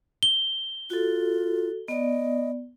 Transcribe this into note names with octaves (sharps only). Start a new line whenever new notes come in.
G7
F4 F#4 A4
B3 D5 D#5